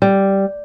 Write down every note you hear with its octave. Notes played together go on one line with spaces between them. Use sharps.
G3